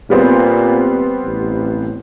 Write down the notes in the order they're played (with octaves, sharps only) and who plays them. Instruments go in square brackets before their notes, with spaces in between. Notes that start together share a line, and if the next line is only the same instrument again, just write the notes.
[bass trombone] A#2 [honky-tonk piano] G3 B3 C4
[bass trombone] A1